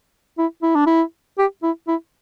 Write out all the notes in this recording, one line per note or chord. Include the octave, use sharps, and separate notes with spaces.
E4
E4
D4
E4
G4
E4
E4